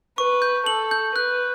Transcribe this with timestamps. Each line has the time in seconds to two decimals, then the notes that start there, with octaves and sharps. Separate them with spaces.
0.18 B4 C#6
0.42 G6
0.66 A4 F#7
0.91 G6
1.15 B4 F#6